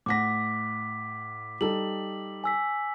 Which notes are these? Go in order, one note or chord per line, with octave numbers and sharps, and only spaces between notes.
A2 F#5 D6 A#6 B6
G3 D#4 A4 F#7
G#5 E6 B6